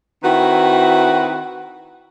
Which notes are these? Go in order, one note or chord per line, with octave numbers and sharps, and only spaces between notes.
D#3 C4 E4 F#4 B4